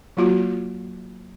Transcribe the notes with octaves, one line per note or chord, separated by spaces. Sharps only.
F#3 A#3 F4 F#4